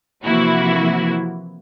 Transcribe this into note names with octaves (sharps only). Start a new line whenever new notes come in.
C3 E3 F3 A#3 E4 F#4